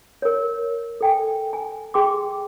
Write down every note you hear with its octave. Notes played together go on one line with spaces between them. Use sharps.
A#4 C#5
A4 G5 G#5
G#5
G#4 G5 C6 D6